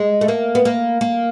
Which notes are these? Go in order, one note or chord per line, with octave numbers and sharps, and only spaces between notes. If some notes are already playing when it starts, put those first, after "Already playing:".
Already playing: G#3
A3
A#3
B3
A#3
A#3